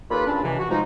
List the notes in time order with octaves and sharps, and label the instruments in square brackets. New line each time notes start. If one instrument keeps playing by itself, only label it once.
[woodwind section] D#2 A#3 F4 A4 B4 B5
A#2 C#3 C#4 D4
C#2 C3 E3
F#4
F3 G#3 D#4